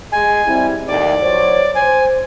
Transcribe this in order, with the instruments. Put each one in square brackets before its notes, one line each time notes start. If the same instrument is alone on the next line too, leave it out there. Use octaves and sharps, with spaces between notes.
[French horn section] G#3 G#4 [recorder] G#5
[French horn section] G3 C4 E4
[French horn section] D#2 A2 D#3 [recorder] D5
[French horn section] F#3 C5 C#5
[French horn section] C5 [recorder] G#5